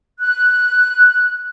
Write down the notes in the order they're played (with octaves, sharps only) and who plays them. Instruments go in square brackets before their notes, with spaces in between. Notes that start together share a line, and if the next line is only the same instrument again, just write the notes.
[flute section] F#6